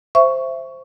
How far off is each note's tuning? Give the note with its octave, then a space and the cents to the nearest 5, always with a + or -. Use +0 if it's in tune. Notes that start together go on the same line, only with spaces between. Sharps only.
C5 +0 E5 +10 C#6 +15